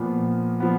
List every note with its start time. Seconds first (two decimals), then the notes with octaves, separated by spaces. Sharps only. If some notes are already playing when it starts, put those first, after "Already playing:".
Already playing: A#2 F3 B3
0.60 F3 B3